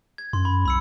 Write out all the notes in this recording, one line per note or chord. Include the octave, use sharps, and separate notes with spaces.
G#6
F#2 C6
B5
C2 B5 E6 C#7